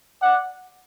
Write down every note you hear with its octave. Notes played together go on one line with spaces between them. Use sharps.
D5 F#5